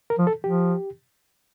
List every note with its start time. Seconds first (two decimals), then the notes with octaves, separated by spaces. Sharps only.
0.10 A#4
0.18 F3
0.27 A4
0.44 F3 G4